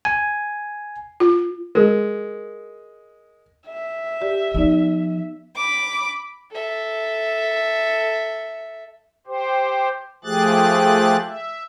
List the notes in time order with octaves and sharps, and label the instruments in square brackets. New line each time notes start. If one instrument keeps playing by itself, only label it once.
[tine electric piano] G#5
[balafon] F4
[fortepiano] G#3 [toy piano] A#4
[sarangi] E5
[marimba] G4 D5
[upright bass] F3 [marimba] B3 D#4 D5
[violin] B5 D6
[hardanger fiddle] A4 E5
[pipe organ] G4 C5
F3 A3 G4 G#4 F#6 A6
E5